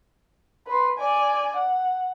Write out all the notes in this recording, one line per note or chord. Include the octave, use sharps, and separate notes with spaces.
B4 C6
D5 G#5
F#5